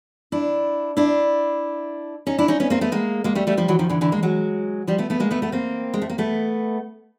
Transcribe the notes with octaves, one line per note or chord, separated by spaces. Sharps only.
D4 E4
D4 E4
C#4 D#4
D4 E4
C#4 D#4
B3 C#4
A#3 C4
A3 B3
G#3 A#3
G#3 A#3
G3 A3
G3 A3
F3 G3
E3 F#3
D#3 F3
D3 E3
D3 E3
G#3 A#3
F#3 G#3
F3 G3
A3 B3
A3 B3
G#3 A#3
A3 B3
A3 B3
A#3 C4
G#3
A3
A#3
A3 B3